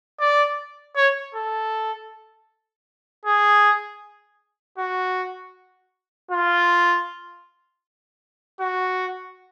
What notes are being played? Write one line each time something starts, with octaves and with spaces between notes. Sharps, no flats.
D5
C#5
A4
G#4
F#4
F4
F#4